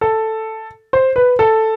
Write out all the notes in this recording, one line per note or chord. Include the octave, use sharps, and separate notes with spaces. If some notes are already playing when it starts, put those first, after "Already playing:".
A4
C5
B4
A4